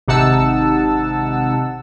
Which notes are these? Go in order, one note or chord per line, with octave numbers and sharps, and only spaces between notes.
G#1 C3 D#4 F#5 A5 E6